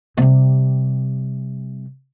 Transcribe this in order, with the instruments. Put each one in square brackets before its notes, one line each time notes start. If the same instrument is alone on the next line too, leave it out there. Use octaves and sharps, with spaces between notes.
[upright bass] C3 G3